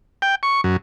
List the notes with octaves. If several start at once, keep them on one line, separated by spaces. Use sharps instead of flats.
G5
C#6
F#2